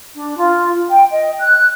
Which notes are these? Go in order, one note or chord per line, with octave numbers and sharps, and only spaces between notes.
D4
F4
G5
D#5
F#6